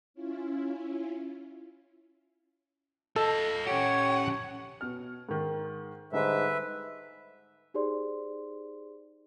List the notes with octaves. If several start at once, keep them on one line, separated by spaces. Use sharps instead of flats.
C#4 E4 F4
F4 A4 D#5
C#4 G4 C#5 F#5
B2 F6
G#2 D#3
G#2 D3 G3 D#4 B4 E5
D#4 G4 G#4 C5 D5 C6